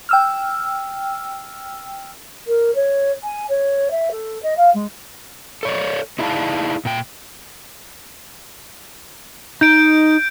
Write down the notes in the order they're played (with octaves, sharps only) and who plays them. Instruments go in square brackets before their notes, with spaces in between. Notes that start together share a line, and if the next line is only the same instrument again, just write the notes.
[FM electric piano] G5 E6 F6
[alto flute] A#4
C#5
G#5
C#5
E5
A4
D#5
F5
G#3
[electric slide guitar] A4 C#5 D5
D#4 E4 G#4 D5 F5 A5
A#2 G5
[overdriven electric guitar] D#4 [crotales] G6 D7